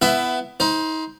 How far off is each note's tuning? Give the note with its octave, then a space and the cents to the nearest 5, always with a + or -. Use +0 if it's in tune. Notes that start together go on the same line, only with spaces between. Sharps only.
B3 +15 E4 +20 E5 +10
D#4 +35 C5 +0